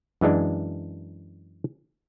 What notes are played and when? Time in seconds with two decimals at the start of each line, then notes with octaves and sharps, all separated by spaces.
0.21 F#2 E3 G#3 D4